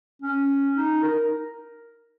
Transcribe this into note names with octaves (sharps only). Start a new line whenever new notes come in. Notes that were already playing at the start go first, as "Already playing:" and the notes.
C#4
D#4
A#4